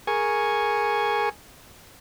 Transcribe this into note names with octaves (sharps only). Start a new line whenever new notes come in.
G#4 A#4 G#5 C#6